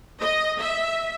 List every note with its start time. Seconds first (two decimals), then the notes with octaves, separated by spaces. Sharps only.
0.20 D#5
0.60 E5